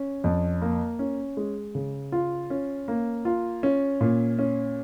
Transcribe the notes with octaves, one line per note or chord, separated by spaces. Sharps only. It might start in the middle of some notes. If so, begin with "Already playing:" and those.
Already playing: C#4
F2
A#3
C#4
G#3
C#3
F4
C#4
A#3
F4
C#4
A#2
C#4